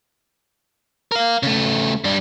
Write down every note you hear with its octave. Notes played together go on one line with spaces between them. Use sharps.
A#4 F5
C#3 A3
G2 G3